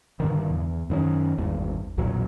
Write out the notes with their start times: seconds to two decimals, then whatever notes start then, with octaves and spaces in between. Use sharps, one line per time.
0.20 G2 D3 D#3
0.50 E2
0.90 F#2 D#3 C#4
1.38 G#1 E2 G2
1.98 B1 E2 A#2 F#3